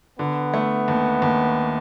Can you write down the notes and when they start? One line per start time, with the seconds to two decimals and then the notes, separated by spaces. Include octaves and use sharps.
0.19 D3 B3
0.54 A3
0.88 D#2
1.22 D#2